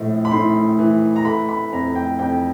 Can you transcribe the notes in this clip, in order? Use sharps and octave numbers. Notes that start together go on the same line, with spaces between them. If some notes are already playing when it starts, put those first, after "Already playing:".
Already playing: A#1 A2
B5
A2 C6
E3
A#5
A3 B5
B5
F2 A#5
G5
F2 G5